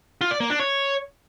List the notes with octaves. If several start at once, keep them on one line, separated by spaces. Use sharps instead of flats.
F4
D5
A#3
D4
C#5